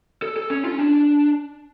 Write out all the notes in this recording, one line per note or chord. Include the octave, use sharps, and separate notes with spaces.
A4
A4
C#4
F4
C#4
D4